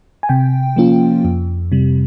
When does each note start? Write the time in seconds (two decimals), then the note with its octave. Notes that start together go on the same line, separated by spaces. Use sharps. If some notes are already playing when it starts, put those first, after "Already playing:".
0.23 G#5
0.29 C3 G5
0.76 F3 A#3 C#4 F4
1.25 F2
1.72 C3 G3